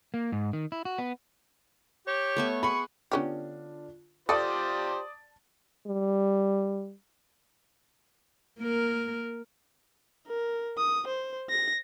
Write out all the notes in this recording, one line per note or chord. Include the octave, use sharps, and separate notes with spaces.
A#3
G#2
D#3
E4
F#4
B3
G4 C#5
A3 B3 E5
G#4 F#5 B5 C#6
D3 B3 C#4 D4 F4 G4
F4 G4 A4 C5 D5 A5 D#6
G3
A#3 A#4
A#4
D#6
C5
A#6